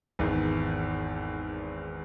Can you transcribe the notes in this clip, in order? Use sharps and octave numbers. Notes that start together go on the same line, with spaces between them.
G#1 E2 D#3